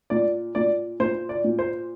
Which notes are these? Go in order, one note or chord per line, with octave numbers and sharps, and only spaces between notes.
A#2 D5
A#2 D5
A#2 C5
D5
A#2
C5